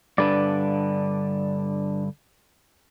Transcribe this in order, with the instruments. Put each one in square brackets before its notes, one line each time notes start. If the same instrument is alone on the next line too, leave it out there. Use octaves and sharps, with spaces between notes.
[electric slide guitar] G2 D3 B4 [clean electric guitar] D4 D5